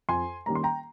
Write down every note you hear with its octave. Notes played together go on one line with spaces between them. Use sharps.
F2 G#5 C6
D#3 G3 A#3 C#4 A#5
C6
G5 A#5